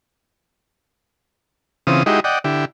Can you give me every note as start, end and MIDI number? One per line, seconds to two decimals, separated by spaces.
1.87 2.03 49
1.87 2.03 52
1.87 2.03 60
1.87 2.03 65
1.87 2.03 87
2.06 2.20 56
2.06 2.20 63
2.06 2.20 64
2.06 2.20 66
2.06 2.20 67
2.06 2.20 75
2.24 2.39 74
2.24 2.39 75
2.24 2.39 78
2.24 2.39 79
2.44 2.65 50
2.44 2.65 64
2.44 2.65 67